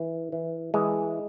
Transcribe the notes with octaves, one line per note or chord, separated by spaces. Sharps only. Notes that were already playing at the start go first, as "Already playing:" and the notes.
Already playing: E3
E3
E3 G#3